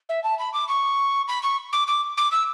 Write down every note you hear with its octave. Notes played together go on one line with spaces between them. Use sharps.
E5
A5
B5
D6
C#6
B5
C#6
D6
D6
D6
E6